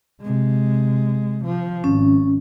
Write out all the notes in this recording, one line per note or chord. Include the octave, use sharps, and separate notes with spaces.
C3 G#3
F3
G#1 C#4